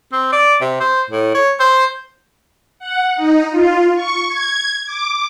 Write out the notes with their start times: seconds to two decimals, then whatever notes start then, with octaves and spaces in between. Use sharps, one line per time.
0.13 C4
0.32 D5
0.61 C3
0.80 C5
1.10 A2
1.35 C#5
1.60 C5
2.79 F#5
3.16 D#4
3.50 F4
3.95 C#6
4.28 G#6
4.85 D6